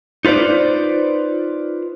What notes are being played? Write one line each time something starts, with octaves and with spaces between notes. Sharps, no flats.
D#4 F4 B4 C5 D5